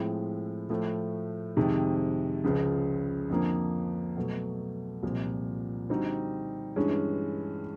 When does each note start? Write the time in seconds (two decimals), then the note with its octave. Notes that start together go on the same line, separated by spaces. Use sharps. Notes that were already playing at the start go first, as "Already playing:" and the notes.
Already playing: A2 F3 G#3 C4 E4
0.69 A2 F3 A3
1.56 F2 C3 D#3 G#3
2.44 C#2 C#3 F3
3.30 F2 D3 F3 A#3
4.16 B2 F#3 A3
5.03 C2 A#2 F3
5.89 D3 G3 C4 D#4 F#4
6.76 G2 E3 G#3 C#4